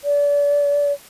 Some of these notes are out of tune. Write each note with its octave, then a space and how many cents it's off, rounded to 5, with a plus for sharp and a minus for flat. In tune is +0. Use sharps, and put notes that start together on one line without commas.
D5 -35